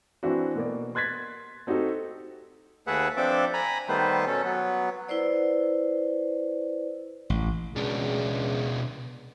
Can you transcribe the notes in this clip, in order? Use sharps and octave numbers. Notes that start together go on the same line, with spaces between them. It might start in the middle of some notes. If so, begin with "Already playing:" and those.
E3 C4 D4 E4 F#4
B2 A#3 D5
C6 F#6 G#6 A6 B6
C4 D#4 F#4 G4 A4
D#2 A3 G#4 B4 E5 F#5
F3 C4 D4 A4 E5 D6
G#5 A#5 B5
D#3 G3 A3 B3 B4 C5
B2 C#4 A4
F#3 B3
E4 B4 C5 D5
A1
C#2 B2 D4